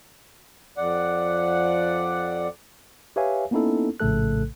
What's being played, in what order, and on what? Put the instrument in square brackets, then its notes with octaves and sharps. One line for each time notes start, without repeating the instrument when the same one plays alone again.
[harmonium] F2 D5 F#5
[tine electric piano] G4 B4 C#5 E5 F5 G#5
A#3 B3 C#4 D#4 E4 A4
A#1 A2 C#3 A3 A4 F#6